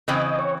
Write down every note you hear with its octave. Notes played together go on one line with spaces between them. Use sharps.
C#3 E3 C4 D#5
C#5